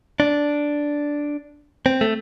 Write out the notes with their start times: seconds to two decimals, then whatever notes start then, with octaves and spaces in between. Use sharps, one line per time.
0.20 D4
1.86 C4
2.01 A3